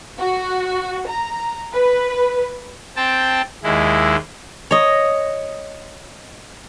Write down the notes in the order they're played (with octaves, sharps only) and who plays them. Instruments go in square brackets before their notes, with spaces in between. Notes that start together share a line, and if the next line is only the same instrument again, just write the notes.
[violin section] F#4
A#5
B4
[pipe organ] C4 G5 A5
D#2 G#3 E4
[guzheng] C#5 D#5